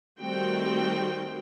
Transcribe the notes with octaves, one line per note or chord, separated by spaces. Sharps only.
D#3 G3 A3 C4 F#4 G5